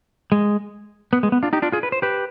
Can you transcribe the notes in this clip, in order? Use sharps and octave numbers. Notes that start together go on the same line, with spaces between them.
G#3
B3
G#3
B3
D4 F4
D#4 G4
D4 F4
F4 G#4
B4
C5
G4 B4